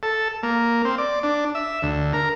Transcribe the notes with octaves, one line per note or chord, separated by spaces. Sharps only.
A4
A#3
C4
D5
D4
E5
D2
A#4